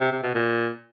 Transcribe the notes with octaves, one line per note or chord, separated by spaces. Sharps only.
C3
C3
B2
A#2